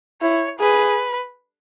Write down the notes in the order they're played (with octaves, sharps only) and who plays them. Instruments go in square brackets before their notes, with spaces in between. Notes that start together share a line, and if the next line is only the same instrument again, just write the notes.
[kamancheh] E4 [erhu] C#5
[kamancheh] G#4 [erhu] B4